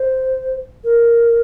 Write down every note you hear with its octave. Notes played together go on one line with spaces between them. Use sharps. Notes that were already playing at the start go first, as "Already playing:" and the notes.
Already playing: C5
A#4